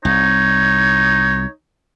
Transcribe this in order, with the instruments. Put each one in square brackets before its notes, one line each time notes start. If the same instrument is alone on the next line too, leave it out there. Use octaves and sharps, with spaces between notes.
[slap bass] C2 [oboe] D#4 [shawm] C#5